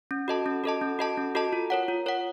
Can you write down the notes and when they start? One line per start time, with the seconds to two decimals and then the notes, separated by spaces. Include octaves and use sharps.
0.11 C#4
0.28 F#4 A4 D#5 A5
0.46 C#4
0.64 F#4 A4 D#5 A5
0.82 C#4
0.99 F#4 A4 D#5 A5
1.17 C#4
1.35 F#4 A4 D#5 A5
1.53 F4
1.70 A#4 C#5 F#5
1.88 F4
2.06 A#4 C#5 F#5